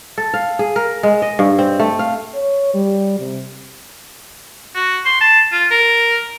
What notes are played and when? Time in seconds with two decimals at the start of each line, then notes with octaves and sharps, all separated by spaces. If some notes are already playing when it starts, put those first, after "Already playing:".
0.18 A4
0.34 F5
0.59 G#4
0.76 A#4
1.03 G#3
1.22 D#5
1.39 G2
1.59 C4
1.79 A3
1.99 F5
2.35 C#5
2.74 G3
3.19 C3
4.75 F#4
5.05 C6
5.21 A5
5.52 F4
5.71 A#4